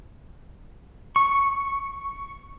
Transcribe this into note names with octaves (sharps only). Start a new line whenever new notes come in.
C#6